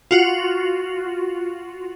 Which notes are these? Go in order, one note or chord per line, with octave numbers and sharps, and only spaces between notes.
F4 F#4